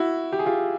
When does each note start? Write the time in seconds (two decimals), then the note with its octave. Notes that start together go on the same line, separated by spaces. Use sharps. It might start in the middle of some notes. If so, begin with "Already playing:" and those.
Already playing: E4 F#4
0.32 G4
0.39 G#4
0.46 F4 G4